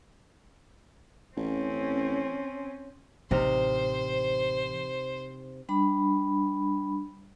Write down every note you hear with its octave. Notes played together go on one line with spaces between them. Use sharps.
A1 C4 C#4
A1 C3 E3 D#4 C5 F6
G3 D4 B5